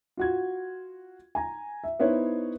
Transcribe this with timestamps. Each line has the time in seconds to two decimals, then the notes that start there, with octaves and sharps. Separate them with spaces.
0.17 F4 F#4 G#6
1.35 G#5 A#5
1.84 E5
2.00 B3 D#4 E4 C5 C#5